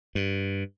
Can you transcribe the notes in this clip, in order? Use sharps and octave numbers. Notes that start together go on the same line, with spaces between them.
G2